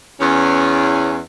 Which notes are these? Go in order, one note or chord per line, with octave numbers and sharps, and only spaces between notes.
E2 C#4